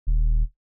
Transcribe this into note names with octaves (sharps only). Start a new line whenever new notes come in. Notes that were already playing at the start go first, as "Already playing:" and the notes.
D#1